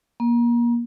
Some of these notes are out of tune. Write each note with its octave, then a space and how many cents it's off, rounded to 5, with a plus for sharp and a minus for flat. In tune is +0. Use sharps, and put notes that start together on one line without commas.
A#3 +30